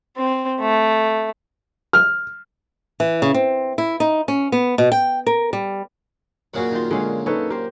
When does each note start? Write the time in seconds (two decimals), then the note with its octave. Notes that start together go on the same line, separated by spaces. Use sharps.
0.17 C4
0.60 A3
1.93 F6
3.00 E3
3.22 C#3
3.34 C4
3.78 E4
4.00 D#4
4.28 C#4
4.52 B3
4.78 B2
4.92 G5
5.26 A#4
5.53 G3
6.54 F#2 A#2 C#3 F#4 G#4 F#5
6.72 D#3 F4
6.91 D3 G#3 C#4 F5
7.26 D#4 A4 B4 C#5
7.50 G4 A#4 C5